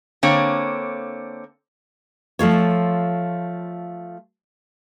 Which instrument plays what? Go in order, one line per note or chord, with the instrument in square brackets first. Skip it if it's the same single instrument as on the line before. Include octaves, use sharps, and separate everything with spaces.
[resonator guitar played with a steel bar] D3 A#3 C4 C#5
[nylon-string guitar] F3 A3 F4 C#5